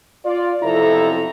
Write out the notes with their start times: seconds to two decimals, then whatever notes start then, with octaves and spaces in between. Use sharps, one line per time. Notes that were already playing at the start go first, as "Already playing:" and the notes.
0.25 F4 D5
0.63 B1 F2 C3 E4 A4 A#5